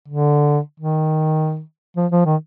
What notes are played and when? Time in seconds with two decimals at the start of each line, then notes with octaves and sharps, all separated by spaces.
0.08 D3
0.80 D#3
1.97 F3
2.11 F3
2.26 D#3